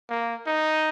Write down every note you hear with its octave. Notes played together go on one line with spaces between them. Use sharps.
A#3
D#4